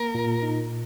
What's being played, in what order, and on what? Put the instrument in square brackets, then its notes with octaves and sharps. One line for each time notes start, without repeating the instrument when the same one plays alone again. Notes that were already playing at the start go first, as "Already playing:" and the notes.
Already playing: [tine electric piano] A#3 [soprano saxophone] A#4
[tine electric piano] A#2
D#4